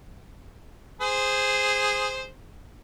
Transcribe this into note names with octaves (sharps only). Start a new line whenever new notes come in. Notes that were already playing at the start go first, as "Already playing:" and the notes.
G#4 C5